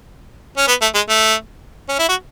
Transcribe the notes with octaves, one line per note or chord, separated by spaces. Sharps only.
C#4
B3
A3
G#3
A3
C#4
E4
F#4